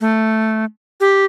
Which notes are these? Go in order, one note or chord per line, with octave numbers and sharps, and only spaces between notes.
A3
G4